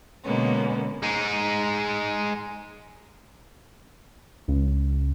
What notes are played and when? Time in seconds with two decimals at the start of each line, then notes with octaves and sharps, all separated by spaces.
0.25 B2 D3 G#3 A#3 B3 C#4
1.03 G#3 D#4
4.48 C#2